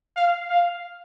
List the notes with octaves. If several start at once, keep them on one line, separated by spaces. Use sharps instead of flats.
F5
F5